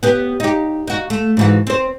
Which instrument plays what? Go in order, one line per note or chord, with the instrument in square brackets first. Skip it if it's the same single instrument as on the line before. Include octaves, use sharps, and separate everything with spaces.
[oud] B3 G4 B4
D#4 G4
D#4 F#4
A3
G#2 E3 F#4
C4 C5